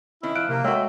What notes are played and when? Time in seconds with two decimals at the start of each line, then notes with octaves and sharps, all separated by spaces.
0.23 D#3 C#4 E4
0.35 F3 F6 F#6 D7
0.49 C3 A#3
0.64 G#3 A3 F#4 C#5 G5 E6